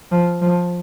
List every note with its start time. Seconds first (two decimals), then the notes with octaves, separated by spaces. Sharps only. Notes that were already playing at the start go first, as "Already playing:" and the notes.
0.12 F3
0.42 F3